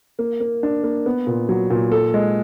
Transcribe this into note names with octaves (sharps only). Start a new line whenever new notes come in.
A#3
A#3
D4
A#3
B3
A#2
F#3
A#2
A4
G#3